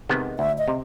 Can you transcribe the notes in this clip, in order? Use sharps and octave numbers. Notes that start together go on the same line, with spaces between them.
C3 D#3 G#3 B3
D2 E5
D#5
C3